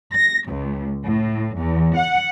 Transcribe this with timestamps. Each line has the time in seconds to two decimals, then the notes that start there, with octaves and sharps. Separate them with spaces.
0.14 A#6
0.48 C#2
1.06 A2
1.57 E2
1.96 F#5